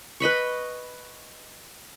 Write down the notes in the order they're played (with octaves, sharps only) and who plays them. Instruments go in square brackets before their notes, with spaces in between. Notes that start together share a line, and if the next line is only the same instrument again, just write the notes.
[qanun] B4 D#5 B5 C#6